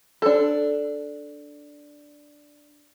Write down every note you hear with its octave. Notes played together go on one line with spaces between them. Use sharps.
D4 A4